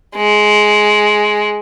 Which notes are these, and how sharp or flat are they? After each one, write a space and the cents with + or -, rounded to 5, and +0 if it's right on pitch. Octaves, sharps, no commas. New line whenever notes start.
G#3 +15